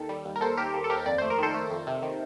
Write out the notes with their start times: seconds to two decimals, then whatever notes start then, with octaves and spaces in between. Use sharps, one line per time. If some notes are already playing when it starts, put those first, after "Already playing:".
Already playing: D#2 D#3 A4
0.09 G3
0.25 D#2
0.36 A#4
0.41 D#2 A4 C5
0.57 D#2 G4 A#4
0.74 D#2
0.84 A4
0.90 D#2 G4 A#4
1.06 F2 D5
1.18 A3 C5
1.30 A#4
1.38 D#3 A4 C5
1.54 A3
1.71 F2
1.87 C3
2.03 D#3